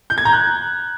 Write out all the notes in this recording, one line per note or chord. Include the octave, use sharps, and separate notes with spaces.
G6
G#6
A#5
F#6